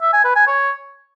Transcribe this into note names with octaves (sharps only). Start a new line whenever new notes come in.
E5
G#5
B4
G#5
C#5